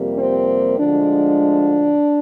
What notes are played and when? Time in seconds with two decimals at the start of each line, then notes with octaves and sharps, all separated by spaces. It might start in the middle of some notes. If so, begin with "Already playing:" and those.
Already playing: F2 C3 G3 A#3
0.19 C4
0.79 D2 D3 F3 G#3 D4